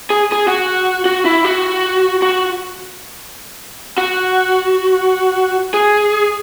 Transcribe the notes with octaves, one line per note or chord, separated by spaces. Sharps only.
G#4
G#4
F#4
F#4
E4
F#4
F#4
F#4
G#4